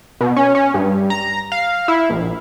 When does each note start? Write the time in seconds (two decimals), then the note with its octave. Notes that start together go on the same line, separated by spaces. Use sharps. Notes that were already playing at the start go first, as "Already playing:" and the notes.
0.21 B2
0.36 C#4
0.55 C#4
0.74 G2
1.10 A#5
1.52 F5
1.88 E4
2.10 A#1